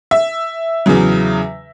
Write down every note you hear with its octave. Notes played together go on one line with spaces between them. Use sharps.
E5
E2 C#3 F#3